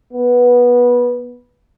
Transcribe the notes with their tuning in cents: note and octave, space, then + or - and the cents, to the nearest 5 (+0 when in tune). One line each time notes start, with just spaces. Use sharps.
B3 -15